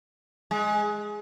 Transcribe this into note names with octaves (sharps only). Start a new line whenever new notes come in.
G#3